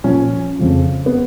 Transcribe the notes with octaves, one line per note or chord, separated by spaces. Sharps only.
A#2 F3 C#4
F2 C#3 F3
B3